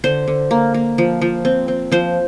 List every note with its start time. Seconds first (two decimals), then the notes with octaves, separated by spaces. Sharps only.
0.04 D3 C5
0.28 D3
0.51 A#3
0.74 A#3
0.98 F3
1.21 F3
1.45 C4
1.68 C4
1.92 F3 C5